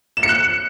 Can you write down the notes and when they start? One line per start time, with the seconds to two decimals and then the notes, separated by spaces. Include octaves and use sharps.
0.17 E7
0.23 C#7
0.29 F#6